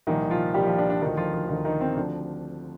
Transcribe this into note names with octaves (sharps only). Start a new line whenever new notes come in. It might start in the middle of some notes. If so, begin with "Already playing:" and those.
C2 A#2 D#3 F3 D#4
F3 F4
C2 A#2 F3 G3 G4
F3 F4
D4
D4
D2 D3 D#3 F3 D#4
F3 F4
F3 F4
D2 D3 D#3 F3 D#4
D#3 D#4
C4
D2 D3 F3 D4